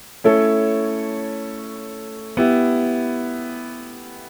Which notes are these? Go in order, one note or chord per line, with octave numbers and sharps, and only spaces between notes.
A3 C#4 E4 A4 C#5
B3 E4 G4